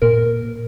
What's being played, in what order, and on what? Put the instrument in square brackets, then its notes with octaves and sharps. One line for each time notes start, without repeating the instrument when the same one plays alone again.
[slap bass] A#2 [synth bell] A#4